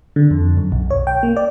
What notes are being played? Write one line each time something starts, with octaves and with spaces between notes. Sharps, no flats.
D3
F2
F#2
B1
C#5
G5
A#3
D5